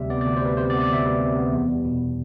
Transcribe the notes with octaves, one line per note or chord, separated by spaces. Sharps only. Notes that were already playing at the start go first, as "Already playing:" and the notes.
Already playing: D2 C3 G3 E5
B3 D5
D2 D5
C5
G3 B4
C3 C5
D5
B3
D5
D2 E5
G3
C3
B3
E2
G3
B2